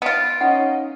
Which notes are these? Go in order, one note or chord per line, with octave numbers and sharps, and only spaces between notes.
B3 F4 D7
C#4 D#4 D#5 F#5